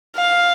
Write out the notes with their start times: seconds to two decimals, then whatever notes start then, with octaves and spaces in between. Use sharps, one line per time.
0.16 F5